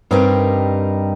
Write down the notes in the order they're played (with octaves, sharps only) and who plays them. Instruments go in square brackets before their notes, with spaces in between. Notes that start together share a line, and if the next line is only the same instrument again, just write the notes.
[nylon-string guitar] G2 [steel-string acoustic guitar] G3 C4 D#4 A#4